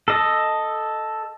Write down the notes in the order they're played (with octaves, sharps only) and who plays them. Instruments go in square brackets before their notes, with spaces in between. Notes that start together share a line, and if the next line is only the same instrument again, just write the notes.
[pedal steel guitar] A4 D#5